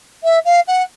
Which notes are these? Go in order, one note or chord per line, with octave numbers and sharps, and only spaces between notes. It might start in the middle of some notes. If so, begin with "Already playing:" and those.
E5
F5
F#5